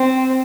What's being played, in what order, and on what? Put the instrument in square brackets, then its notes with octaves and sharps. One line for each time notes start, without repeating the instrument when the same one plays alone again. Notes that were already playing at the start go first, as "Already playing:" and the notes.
Already playing: [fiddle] C4